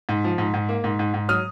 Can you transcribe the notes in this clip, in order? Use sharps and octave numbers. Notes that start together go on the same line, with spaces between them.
G#2
F3
G#2
G#2
A#3
G#2
G#2
G#2
F#3 D#6 F6